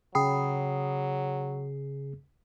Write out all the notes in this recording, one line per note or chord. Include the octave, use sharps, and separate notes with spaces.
C#3 F#3 G#4 G5 B5 D#6 C7